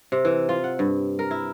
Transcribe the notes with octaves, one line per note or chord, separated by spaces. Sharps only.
C3
E3
F4
F#5
G2
A#4
E4